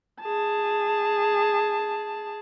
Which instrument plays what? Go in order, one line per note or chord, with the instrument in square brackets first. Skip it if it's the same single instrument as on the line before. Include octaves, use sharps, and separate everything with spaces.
[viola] G#4 A5